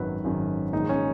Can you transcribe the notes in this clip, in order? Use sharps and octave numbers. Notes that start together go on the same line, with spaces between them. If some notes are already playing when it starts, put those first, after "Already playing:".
Already playing: G#1 F#2 D#3 F#3 B4
G#1 F#2 D#3 F#3
A#1 G#2 D#3 D#4
C#4